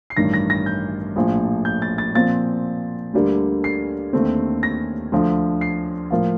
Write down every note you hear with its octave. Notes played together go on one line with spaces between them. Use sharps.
C7
A1 G2 D#3 A#6
A#6
A#6
G6
A#1 A2 F3
G6
A6
A6
A#2 F3 C4 A6
D2 D3 G3 A#3
C7
D#2 D3 A3 C4
A#6
D2 D3 F3
C7
A2 F3 A#3 F4